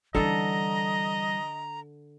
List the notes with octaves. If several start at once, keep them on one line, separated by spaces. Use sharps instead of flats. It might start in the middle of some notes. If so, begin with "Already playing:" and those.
D3 E3 G3 A4 D#5 A#5